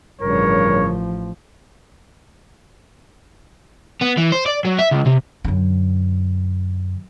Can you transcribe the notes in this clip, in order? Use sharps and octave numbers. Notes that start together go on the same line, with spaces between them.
A1 G2 C#3 F3 A#4 C#5
B3
E3
C5
D5
F#3
E5
C#2
C3
F#2 D3